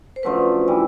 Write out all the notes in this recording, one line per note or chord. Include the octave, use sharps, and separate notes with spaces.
C5
F#2 D3 F3 A3 B4
E3 G3